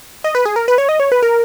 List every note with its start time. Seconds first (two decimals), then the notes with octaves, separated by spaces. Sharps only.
0.24 D#5
0.35 B4
0.45 G#4
0.56 A#4
0.68 B4
0.78 C#5
0.89 D#5
1.00 C#5
1.12 B4
1.23 A#4